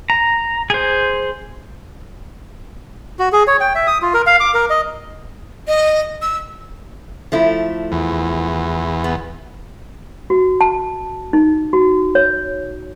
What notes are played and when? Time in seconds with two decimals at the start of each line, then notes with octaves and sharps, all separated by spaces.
0.10 A#5
0.70 G#4 C5
3.19 F#4
3.32 G#4
3.47 C#5
3.61 G5
3.75 E5
3.87 D#6
4.02 F4
4.14 A#4
4.27 F5
4.40 D6
4.54 A#4
4.70 D#5
5.68 D#5
6.22 E6
7.32 F3 A3 E4
7.92 E2
9.04 B3
10.30 F#4
10.61 A5
11.33 D#4
11.73 F#4
12.15 C#5